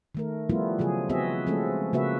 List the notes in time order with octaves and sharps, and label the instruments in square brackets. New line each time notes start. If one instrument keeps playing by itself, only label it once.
[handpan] D#3 A3 A#4
F3 G3 A3 B3 E4 F4
C#3 F3 F#3 G#4
B3 C4 F#4 G#4 D#5 E5
F3 G#3 A3 C4 C#4 A4
C#3 A#3 F#4 B4 E5